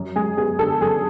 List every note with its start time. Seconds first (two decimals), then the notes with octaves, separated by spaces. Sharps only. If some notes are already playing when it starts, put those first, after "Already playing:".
Already playing: F#2
0.16 G#3 G#4
0.37 B3 G#4
0.59 D3 A4
0.81 F#2 G#4